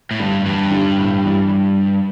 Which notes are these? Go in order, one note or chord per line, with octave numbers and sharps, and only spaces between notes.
A2
G2 D3 G3
E2 G2
D3 G3
A2
E3 G3